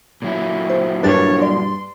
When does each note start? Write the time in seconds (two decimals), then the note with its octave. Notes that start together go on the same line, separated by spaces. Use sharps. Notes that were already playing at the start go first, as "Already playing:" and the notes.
0.22 A#2 F#3 E4
0.69 C5
1.03 G2 G3 D4 A#4 B4 C#5 A6
1.42 D5 C6